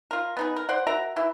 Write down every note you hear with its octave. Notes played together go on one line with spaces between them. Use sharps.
F4 A#4
B3 D#4 G#4
A#4
C5 D5 F#5
F#4 A#4 E5 A#5
E3 E4